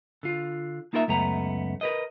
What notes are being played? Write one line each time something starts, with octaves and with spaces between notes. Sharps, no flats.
D3 F4
A#3 D#4 F4 A#4 C5 E5
C#2 F#2 A3 B3 A#5
A#4 B4 D#5